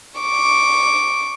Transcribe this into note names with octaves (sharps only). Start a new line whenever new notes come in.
C#6 D6